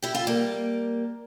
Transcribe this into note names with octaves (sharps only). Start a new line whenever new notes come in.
E4 G4
F4 A4
G3 A#3